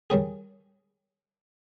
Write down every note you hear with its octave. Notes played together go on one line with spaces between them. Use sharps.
D#3 G3 C#4 G#4